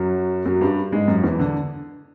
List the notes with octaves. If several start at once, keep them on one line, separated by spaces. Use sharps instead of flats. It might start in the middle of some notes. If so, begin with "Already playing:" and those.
Already playing: F#2 F#3
F#2 F#3
G2 G3
G#2 G#3
F#2 F#3
E2 E3
D3